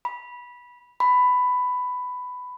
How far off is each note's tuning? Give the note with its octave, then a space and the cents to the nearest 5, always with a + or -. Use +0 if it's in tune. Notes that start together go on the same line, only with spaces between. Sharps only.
B5 -15
B5 +15